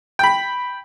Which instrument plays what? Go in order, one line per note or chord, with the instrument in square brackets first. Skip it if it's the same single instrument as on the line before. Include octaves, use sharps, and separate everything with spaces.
[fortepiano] G5 B5